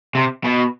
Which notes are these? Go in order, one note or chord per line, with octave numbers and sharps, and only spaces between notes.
C3
B2